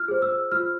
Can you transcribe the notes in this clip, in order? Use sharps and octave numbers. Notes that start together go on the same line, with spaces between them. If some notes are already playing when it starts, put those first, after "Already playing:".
Already playing: F4 F6
G#4 C5
E6
F4 F6